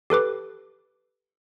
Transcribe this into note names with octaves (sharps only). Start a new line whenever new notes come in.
G4 A4 B4 D6